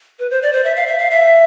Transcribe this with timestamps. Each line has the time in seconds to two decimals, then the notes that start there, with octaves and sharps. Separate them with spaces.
0.19 B4
0.30 C5
0.42 D5
0.53 C5
0.64 E5
0.76 F5
0.87 E5
0.98 F5
1.11 E5